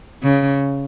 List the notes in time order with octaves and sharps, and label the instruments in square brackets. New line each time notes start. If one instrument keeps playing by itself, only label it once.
[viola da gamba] C#3